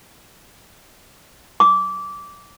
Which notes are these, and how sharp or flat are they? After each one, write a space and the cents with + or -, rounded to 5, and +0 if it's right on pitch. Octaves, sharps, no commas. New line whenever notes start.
D6 -20